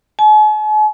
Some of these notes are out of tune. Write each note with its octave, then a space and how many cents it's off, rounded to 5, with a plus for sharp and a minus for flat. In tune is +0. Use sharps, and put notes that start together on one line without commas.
G#5 +45